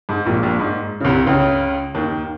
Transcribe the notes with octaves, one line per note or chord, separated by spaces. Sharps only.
G#2
A#1 A#2
A#1 A#2
G#2
C#3
C2 C3
C#2 C#3
D#2 D#3